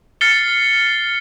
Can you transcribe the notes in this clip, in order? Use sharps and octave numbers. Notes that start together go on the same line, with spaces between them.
F6 A6 C7 C#7 G7